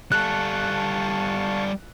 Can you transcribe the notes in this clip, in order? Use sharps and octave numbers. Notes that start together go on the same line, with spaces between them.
G3 A4 F5 A5 C#6 F#6